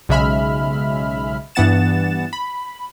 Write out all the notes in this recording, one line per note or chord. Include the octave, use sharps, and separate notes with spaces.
B1 C#3 G#3 E5 B5 F6
G2 E3 B3 F#5 A6 E7
B5